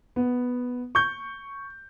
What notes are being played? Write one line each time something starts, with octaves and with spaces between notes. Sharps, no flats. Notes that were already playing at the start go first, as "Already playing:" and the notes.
B3
C#6 G6